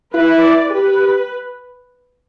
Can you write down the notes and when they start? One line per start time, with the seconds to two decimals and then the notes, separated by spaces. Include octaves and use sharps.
0.14 E4 B4
0.42 D5
0.70 G4 B4